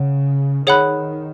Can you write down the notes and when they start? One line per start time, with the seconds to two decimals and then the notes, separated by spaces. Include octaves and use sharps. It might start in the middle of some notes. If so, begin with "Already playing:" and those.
Already playing: C#3 C#5 F#5
0.66 D#3 G#4 C#5 F#5 B5 F#6